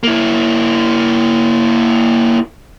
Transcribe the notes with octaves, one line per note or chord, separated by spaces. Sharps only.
A#3 E4